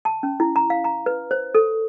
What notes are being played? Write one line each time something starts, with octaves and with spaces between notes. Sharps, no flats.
A5
C#4
E4
A#5
F5
A#5
B4
C5
A4